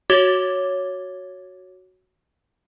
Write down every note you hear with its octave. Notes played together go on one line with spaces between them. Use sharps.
F#4 C#5 D6 G#6 A6 G7